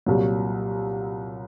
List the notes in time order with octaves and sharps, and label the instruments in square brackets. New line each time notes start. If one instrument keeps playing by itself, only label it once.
[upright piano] C2 A#2 F#3